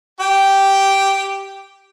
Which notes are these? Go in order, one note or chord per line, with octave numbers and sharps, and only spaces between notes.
G4 G5